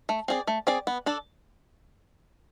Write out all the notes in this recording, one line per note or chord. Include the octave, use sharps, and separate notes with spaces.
A3
C4 G#4 D5
A3
C4 G#4 D5
B3
D4 A4 D5